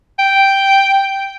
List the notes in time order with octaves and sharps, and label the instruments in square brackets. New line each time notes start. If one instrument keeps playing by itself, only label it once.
[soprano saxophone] G5